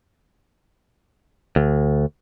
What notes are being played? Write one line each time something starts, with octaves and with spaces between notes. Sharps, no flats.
D2